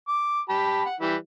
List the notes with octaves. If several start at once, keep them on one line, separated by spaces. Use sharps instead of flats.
D6
G4 A5 B5
F#5
E3 G3 E4